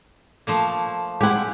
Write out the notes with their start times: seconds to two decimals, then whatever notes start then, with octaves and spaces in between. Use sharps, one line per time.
0.47 F3 A3 A#3
1.21 G#3 E4 G4 F#5